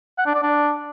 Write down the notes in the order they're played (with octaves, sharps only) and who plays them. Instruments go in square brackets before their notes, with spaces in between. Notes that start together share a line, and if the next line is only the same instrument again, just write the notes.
[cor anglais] F#5
D4
D5
D4